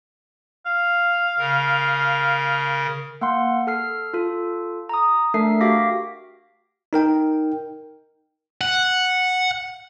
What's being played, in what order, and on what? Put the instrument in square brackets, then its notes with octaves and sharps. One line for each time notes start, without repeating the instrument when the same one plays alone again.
[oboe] F5
[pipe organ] C#3 A#4
[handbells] A#3 F#5 C6
A4 F6 C7
F4 A4
A#5 D#6
A3 D4 A4 A#4 E5 C7
F#4 G4 F5 D6 A#6 B6
[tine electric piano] D#4 A#4 G5
[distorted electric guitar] F#5